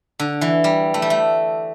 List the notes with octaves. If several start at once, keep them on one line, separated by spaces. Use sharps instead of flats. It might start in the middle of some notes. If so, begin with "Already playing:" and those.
D3
E3
G3
A3
G3
A3